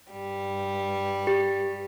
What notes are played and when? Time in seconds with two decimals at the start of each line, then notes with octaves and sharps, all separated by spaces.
0.11 G2 G3
1.27 G4